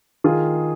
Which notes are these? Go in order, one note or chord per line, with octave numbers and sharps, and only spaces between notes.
D#3 F4 G#4